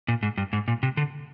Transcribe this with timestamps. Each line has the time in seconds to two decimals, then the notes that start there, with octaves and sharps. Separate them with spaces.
0.08 A#2
0.23 G#2
0.38 G2
0.53 G#2
0.68 A#2
0.83 C3
0.97 D3